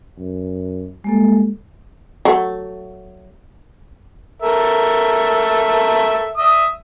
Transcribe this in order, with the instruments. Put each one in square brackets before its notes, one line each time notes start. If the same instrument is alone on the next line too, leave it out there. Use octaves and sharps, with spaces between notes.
[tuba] F#2
[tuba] G3 [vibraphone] G#3 A#3 A4
[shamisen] F#3 A3
[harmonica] A4 A#4 E5
E5 D#6